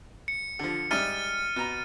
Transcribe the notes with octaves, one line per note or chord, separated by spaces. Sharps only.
C#7
D3 F3
G#2 G3 E5 F6 A6 D#7
B2 A#5